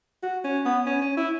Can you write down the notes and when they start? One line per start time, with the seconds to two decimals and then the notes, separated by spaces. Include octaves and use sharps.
0.23 F#4
0.44 C#4
0.65 B3
0.86 C#4
1.02 C#4
1.17 E4